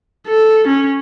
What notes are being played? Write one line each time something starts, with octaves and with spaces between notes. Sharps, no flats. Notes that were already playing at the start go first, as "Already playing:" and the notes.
A4
C#4